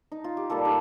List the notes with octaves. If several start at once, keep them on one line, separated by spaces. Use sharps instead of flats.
D#4
F4
G4
A#2 G3 F4 A4
D#4 G4